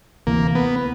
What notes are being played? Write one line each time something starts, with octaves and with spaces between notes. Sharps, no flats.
D2 C3 E3 A#3
B3